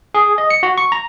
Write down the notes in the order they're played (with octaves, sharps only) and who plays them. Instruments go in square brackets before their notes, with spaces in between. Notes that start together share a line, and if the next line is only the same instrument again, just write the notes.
[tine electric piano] G#4
D#5
C#7
F#4
C#6
A#5